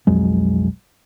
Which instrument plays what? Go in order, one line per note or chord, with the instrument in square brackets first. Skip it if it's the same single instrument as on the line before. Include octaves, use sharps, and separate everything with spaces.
[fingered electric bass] B1 F2 F#3 G#3